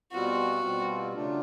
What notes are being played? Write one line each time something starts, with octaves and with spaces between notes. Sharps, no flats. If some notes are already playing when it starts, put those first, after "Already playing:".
B2 G3 C4 F4 F#4
B2 G3 C4 F4
C#3 F#3 A3 D4 F4